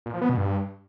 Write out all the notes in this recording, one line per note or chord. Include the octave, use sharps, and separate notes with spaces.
A#2
F3
B3
B2
G2